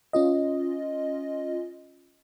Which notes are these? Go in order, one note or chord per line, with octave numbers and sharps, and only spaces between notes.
C#4 F4 D#5